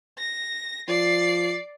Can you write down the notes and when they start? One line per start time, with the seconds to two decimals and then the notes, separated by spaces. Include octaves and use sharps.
0.18 A#6
0.88 F3 D5 C7